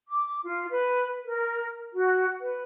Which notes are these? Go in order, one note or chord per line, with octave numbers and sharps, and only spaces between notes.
D6
F4
B4
A#4
F#4
B4